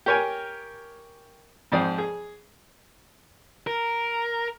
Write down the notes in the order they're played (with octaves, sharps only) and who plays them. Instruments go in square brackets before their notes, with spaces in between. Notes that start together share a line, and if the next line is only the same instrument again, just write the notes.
[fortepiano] G4 A#4 C#5 G5 G#5
F2 G#2 F3 D5 G5 D#6
G#4
[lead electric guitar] A#4